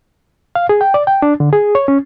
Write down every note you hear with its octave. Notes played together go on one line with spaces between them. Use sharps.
F5
G#4
G5
D5
G5
D4
D3
G#4
C#5
C#4